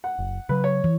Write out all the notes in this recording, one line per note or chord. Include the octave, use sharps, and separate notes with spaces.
F#5
F#1
C#3 F#3 B4
C#5
E3